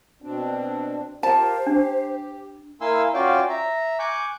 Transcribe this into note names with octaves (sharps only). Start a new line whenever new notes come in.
B2 C4 D4
F4 G4 A#4 C5 A5
D4 G4
A#3 E4 F5 G#5 C6 E6
C#4 F4 F#4 D5 F5 G5
E5 A#5
G#5 C#6 D6 F#6 G6